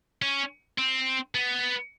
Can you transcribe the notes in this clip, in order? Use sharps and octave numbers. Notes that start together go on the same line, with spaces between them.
C#4
C4
B3